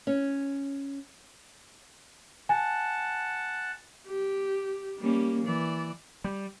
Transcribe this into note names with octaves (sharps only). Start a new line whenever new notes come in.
C#4
F#5 G#5 A5
G4
G3 A#3 C#4
E3 D5
G3